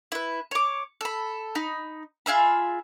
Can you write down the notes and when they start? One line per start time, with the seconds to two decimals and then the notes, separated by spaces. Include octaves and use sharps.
0.12 E4 B4
0.51 C#5 D6
1.01 A4 B5
1.55 D#4 B5
2.26 F4 G#4 E5 B5